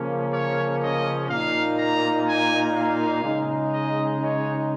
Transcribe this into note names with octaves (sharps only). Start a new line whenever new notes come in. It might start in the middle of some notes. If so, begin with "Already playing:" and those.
Already playing: C#3 F3 A#3 C#4
C#5
D#5
A#2 A#3 D#4 F5
A#5
G#5
F5
C#3 G#3 D#4
D#5
C#5